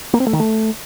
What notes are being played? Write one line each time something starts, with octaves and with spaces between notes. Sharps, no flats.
A#3
C4
A3
D#3
A3